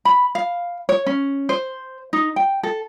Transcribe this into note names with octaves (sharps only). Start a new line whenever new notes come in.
B5
F5
C#5
C#4
C5
D#4
G5
A4